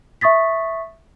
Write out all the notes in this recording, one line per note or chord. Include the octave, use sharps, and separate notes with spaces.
E5 C#6 D#6 A6 B6